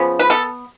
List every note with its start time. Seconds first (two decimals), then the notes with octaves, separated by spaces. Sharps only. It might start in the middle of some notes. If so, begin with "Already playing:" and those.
Already playing: C#3 F3 B3
0.19 B4
0.30 B3 A4